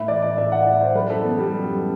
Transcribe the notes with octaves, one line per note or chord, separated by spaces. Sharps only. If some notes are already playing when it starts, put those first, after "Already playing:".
Already playing: A2 B4 E5
E3 D5
D5
A2 E5
F#5
E3 D5
C5
F#2 B4
A4
E3 B3
G3
F#2